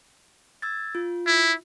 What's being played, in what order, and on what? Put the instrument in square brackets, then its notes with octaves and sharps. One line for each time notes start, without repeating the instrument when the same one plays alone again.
[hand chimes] E6 G#6 A6
F4
[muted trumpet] E4